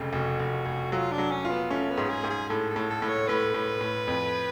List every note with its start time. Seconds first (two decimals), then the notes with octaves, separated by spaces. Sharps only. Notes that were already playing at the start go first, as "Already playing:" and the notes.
Already playing: F1 F2 C#3
0.13 F1 F#4
0.40 F1
0.66 F1
0.92 F#3 F4
1.12 D4
1.18 F#3
1.31 C#4
1.45 F4
1.51 B3
1.70 A3 C#4
1.90 B3
1.97 G#2
2.10 G#4
2.24 G#2
2.30 G#4
2.49 A2 A4
2.70 A4
2.76 A2
2.90 A4
3.02 A2
3.09 C#5
3.28 A2 B4
3.54 A2
3.81 A2
4.07 F2